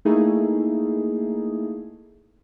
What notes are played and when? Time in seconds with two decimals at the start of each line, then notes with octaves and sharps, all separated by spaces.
0.05 A3 A#3 D#4 E4 G#4 A4